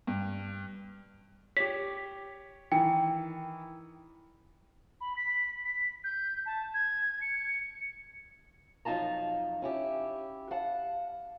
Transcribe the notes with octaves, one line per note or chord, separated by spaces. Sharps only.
G2
G4 C#5 B6
D#3 E3 G5
B5
B6
B6
G6
A5
G#6
C#7
F2 F#3 D#4 F4 A5 A#5
C#4 E4 G4
F5 F#5 A5